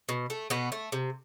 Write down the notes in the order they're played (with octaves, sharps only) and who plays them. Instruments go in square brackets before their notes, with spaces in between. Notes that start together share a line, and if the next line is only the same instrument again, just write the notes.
[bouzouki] B2
A3
B2 B3
A3
C3